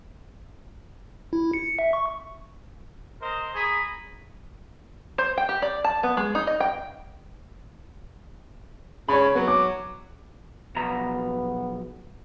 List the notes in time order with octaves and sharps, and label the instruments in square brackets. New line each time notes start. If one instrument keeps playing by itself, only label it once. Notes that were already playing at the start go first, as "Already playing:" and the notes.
[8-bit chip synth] E4
C#7
E5
C#6
[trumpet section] A#4 C5 D#5
G#4 A#5 B5 C#6 D#6
[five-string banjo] C5
G5
G4
D5
A5
B3
G#3
D#4
D#5
G5
[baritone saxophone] C#3 [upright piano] C#5 B5
[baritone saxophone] F#3 [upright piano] B3
[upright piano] D6
[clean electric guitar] B1 F3 A#5 [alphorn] B3